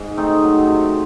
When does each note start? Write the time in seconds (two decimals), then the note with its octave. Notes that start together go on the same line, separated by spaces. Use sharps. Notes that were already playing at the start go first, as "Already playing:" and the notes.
Already playing: G#2
0.17 A3 C4 D#4
0.42 F#3
0.67 C3